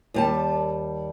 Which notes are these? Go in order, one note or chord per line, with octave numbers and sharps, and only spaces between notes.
D#2 G3 A5